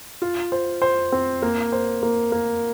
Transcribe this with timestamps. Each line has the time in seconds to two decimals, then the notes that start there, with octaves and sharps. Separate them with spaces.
0.22 F4
0.52 C5
0.82 C5
1.12 C4
1.42 A#3
1.72 C5
2.03 A#3
2.32 A#3